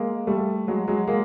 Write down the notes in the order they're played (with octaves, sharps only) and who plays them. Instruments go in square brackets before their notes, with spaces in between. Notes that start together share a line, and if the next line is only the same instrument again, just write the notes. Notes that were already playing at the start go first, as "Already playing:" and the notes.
Already playing: [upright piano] G#3 A#3
G3 A3
F#3 G#3
F#3 G#3
G#3 A#3